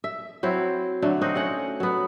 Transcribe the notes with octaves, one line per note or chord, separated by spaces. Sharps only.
E5
F#3 C4 E4
D3 F#3 A3
C4 D#4 F#4
A3 C#4 F#5
F#3 B3